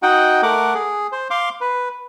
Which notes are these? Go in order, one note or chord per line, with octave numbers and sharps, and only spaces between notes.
D#4 F#4 D#5 F#5 G5
A3 A#4 F#5 D6
G#4
C5
F5 C6 D6
B4